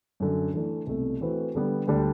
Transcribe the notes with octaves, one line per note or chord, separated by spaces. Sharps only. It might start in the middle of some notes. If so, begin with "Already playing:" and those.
F#2 D3 F#3
E3 A3 D4
C2 B2 A3
E3 A3 C4 F#4 B4
D3 G3 B3
D2 D3 G3 D4